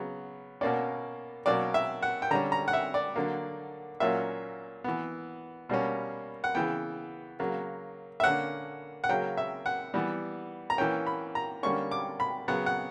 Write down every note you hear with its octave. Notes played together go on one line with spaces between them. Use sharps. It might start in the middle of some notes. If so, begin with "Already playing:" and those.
Already playing: C#3 F#3 B3
B2 A#3 C#4 D5
B2 F#3 A#3 C#4 D5
E5
F#5
G5
D3 G3 C#4 A#5
A#5
F#5
E5
D5
D3 F#3 A#3
A#2 F#3 A#3 C#4 E5
E3 B3
B2 G3 A#3 C#4
F#5
C#3 E3 B3 G5
C#3 F#3 A#3
E5
D3 A#3 C#4 F#5
F#5
C#3 F#3 A#3 C#4 G5
E5
F#5
E3 G3 B3
A#5
E3 A#3 C#4 G5
B5
A#5
D3 G3 A#3 C#4 C#6
D6
B5
C#3 F#3 B3 F#5
F#5